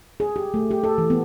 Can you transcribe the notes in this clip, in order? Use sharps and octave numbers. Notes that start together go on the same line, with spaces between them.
G#4
G4
A3
G4
A4
E3
B3